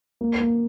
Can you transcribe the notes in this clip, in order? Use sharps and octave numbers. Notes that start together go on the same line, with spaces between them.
A#3
A#3